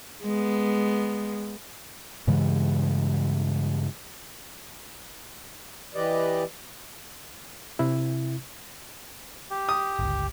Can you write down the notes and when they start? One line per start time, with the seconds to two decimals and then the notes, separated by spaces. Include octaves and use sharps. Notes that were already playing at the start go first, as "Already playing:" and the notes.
0.23 G#3 B3
2.27 G2 C#3 E3 G#3
5.95 E3 G4 B4 D5 D#5
7.79 C3 E4
9.50 G4
9.69 D#6
9.99 G1 C#2